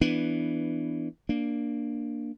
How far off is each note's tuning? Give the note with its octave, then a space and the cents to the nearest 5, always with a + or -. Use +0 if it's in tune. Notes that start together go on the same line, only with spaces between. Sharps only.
E3 +5 B3 +0 D4 +0
A#3 +0 D4 +0